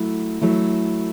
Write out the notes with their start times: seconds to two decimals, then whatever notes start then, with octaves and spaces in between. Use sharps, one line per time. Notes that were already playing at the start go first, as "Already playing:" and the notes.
Already playing: F#3 A3 E4
0.41 F#3 A3 E4